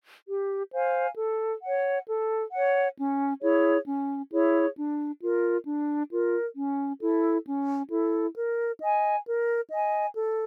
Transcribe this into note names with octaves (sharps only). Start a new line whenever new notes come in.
G4
C5 F5 G#5
A4
C#5 F#5
A4
C#5 F#5
C#4
E4 G#4 C#5
C#4
E4 G#4 C#5
D4
F4 A#4
D4
F4 A#4
C#4
E4 A4
C#4
E4 A4
A#4
D#5 G#5
A#4
D#5 G#5
A4